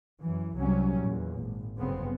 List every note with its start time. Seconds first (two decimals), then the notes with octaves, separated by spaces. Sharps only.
0.19 F#2 E3
0.56 C2 C3 F#3 G3 C#4
1.01 E2 A#2
1.38 G#1
1.78 G1 F#2 C#3 B3 C4